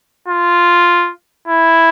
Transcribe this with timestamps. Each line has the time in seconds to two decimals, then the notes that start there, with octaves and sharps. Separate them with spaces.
0.28 F4
1.48 E4